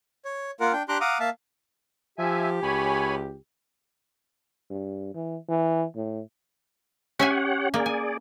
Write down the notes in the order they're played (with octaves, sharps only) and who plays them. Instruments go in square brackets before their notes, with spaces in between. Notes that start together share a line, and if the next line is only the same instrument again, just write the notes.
[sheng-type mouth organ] C#5
A#3 F4 A#4 F#5
D4 G5
D4 G4 A#5 C6 D6 F#6
F5 F#5 A#5 D6 D#6
A#3 E5 F5 A5
[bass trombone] F3 [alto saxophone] G4 [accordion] E5 G#5
[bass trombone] C#2 [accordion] C#5 G#5 B5
[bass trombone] G2
E3
E3
A2
[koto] C#4 E5 G#5 [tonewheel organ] G4 C#5 F#5
[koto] A#3 [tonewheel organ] G#4 D5
[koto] G#5